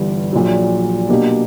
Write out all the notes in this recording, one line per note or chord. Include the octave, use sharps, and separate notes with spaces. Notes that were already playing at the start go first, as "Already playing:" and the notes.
Already playing: G1 G2 E3 G3
A#1 A#2 F#3
B2 A#3 D4 G4